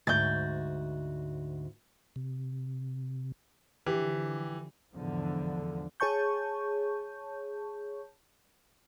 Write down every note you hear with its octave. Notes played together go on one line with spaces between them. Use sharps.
D2 G#2 F#4 G6 A6
C3
D3 E3 F3 G4
E2 G#2 D3 F3
G#4 C#5 A5 C#6 G6